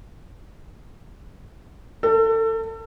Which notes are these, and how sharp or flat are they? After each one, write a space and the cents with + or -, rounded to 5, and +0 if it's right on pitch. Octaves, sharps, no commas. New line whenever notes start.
A4 +30